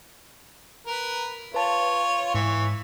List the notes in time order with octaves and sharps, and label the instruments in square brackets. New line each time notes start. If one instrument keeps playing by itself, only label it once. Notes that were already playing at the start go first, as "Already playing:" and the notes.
[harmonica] A#4 B4
[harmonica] F4 C#5 [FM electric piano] B4 A5
[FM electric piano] G#2 [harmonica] E3 C#6